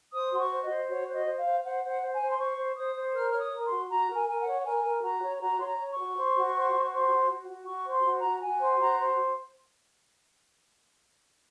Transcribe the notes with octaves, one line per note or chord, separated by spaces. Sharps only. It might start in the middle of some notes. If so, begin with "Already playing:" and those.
C5 D#6
F#4 C6
C#6
C5
D#5
C5
F#4 C#5
C5
D#5
C5
F5
C5
C5 F#5
C5
F#5
C5
G#5
C5
C6
C5 C#6
C5
C5 D#6
C5
A#4 F6
C#5 F6
D#6
A#4
C6
F#4
F#4 A#5
A#4
G#5
A#4 G#5
F#5
C#5
A#4 G#5
A#4
F#4 A#5
C#5
F#4 A#5
C#5 C6
A#5
C#5
C#6
F#4
C5
F#4
C5
F#4
C5
F#4
F#4
F#4
F#4 C#6
C5
C6
F#4
A#5
F#4
A#5
F#4 G#5
C5
F#4 A#5
C5